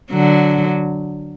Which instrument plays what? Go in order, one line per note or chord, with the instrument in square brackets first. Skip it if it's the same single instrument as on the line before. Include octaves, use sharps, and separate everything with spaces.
[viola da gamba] D3 F#3